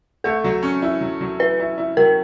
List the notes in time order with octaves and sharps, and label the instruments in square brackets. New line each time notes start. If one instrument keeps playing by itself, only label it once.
[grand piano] A3 [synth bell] A4
[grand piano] F#3
C#4
E4
F#3
F#3
[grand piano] E4 [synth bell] B4
[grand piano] E4
E4
[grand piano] F#3 [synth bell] A#4